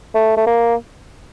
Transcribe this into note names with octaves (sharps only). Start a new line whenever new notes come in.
A3
A3
A#3